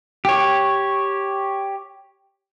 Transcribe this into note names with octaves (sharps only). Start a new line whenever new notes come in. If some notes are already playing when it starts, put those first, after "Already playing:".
G4 C#5